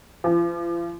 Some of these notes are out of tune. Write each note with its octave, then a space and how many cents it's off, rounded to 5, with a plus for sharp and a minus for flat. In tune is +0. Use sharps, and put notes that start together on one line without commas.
F3 -35